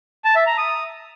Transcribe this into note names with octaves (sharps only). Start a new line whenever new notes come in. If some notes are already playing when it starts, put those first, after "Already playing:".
A5
E5
A#5
D#6